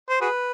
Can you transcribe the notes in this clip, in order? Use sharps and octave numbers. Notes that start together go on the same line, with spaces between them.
C5
F#4 G#4 B4